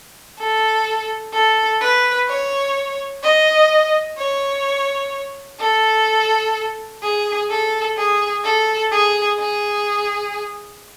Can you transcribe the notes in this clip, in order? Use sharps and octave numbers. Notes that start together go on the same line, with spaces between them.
A4
A4
B4
C#5
D#5
C#5
A4
G#4
A4
G#4
A4
G#4
G#4